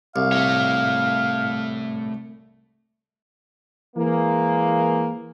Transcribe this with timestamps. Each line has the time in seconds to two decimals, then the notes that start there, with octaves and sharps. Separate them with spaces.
0.16 C2 F5
0.33 A3 C#5
3.96 E3 G#3 A#3